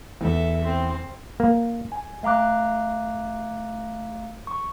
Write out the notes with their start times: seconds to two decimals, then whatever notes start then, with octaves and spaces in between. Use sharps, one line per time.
0.21 E2 A4 E5
0.64 C4
1.40 A#3
1.92 G#5
2.23 A3 F5 A#5 D6 F#6
4.47 C#6